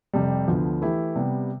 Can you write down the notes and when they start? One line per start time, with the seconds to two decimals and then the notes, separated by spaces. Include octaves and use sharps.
0.13 F2 C3 G3
0.48 D2 D3 F3 B3
0.82 E3 A3 E4 G4
1.15 C3 G3 B3